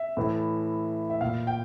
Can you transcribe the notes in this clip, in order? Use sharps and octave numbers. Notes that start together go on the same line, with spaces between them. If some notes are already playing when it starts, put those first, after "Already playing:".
Already playing: E5
A2 E3
E5
A#2 F5
G5